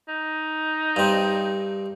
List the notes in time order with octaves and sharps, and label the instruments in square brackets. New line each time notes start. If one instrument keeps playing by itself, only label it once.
[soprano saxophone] D#4
[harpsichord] G2 C4